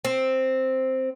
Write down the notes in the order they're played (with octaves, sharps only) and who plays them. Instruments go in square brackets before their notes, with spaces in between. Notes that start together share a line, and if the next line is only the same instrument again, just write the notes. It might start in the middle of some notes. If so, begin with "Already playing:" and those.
[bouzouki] C4